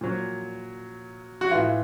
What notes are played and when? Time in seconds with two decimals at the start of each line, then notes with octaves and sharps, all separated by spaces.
0.01 A#2 F#3
1.41 F#4
1.51 E3 F4
1.55 A2